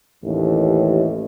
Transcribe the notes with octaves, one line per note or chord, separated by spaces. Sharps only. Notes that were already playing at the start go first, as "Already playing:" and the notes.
A1 D#2